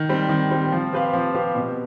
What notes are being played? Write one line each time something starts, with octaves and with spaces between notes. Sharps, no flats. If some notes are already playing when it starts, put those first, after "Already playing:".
Already playing: D#3
G3 C4
D#3
G3 C4
F3
C4 G4 B4 F5
F3
C4 G4 B4 F5
B2